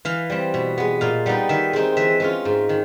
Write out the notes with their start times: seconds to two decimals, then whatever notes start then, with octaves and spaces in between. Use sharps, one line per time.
0.05 E3 F5
0.30 G3 C4
0.54 B2
0.78 G#3 B3
1.01 A#2 F5
1.26 G3 B3 D#4
1.49 D#3 E5
1.73 G#3 C4 D#4
1.97 E3 E5
2.20 G#3 C#4 F4
2.45 G#2
2.69 D#3